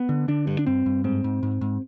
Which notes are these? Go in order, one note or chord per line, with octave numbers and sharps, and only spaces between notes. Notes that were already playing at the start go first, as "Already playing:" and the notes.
Already playing: B3
D3
D3 D4
G2
D4
G2 C4
G2
G#2 C4
G#2
G#2
G#2